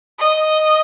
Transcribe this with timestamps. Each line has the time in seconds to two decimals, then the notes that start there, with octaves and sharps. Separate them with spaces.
0.19 D#5